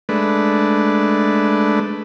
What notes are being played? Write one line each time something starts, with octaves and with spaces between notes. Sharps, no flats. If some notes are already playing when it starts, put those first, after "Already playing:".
G#3 A3 D4 B4